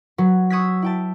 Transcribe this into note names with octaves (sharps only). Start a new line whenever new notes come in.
F#3 F#4 B4
C#6 D#6 E6 F#6 G#6 B6
E4 G5 A5